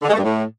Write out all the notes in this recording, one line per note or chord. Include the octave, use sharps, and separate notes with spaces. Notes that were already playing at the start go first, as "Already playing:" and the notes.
D3
G#3
A3
G2
A2